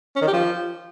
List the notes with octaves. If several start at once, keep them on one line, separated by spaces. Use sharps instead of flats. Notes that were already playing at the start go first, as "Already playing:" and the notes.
C#4
D#3
G4
F3